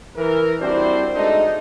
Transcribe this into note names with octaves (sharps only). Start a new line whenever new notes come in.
E3 A#4
G3 C4 D4 E4 F#4 C5
G#3 A3 D4 D#4